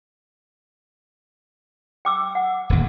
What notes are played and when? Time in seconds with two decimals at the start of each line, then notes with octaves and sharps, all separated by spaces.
2.05 G5 D6 E6
2.35 F#5
2.70 D1 D#2